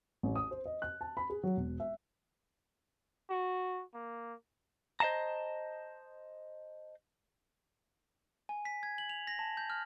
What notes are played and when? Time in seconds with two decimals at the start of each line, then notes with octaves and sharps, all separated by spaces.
0.23 A1
0.36 D#6
0.51 C5
0.66 D#5
0.82 F#6
1.01 A5
1.17 B5
1.30 G#4
1.43 F#3
1.57 E1
1.80 E5
3.30 F#4
3.94 A#3
5.00 C5 D#5 F5 A5 A#5
8.49 G#5
8.65 B6
8.83 G#6
8.98 F#7
9.10 F7
9.27 A#6
9.39 A5
9.57 G6
9.70 F6